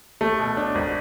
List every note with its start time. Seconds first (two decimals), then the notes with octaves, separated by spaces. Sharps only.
0.21 A3
0.39 B2
0.57 D4
0.75 G#1